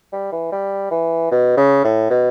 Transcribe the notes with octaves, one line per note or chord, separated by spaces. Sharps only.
G3
E3
G3
E3
B2
C#3
A2
B2